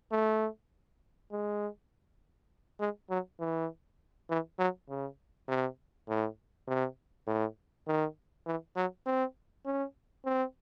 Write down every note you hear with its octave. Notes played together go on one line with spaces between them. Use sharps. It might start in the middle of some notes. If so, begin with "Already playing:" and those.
A3
G#3
G#3
F#3
E3
E3
F#3
C#3
C3
A2
C3
A2
D#3
E3
F#3
C4
C#4
C4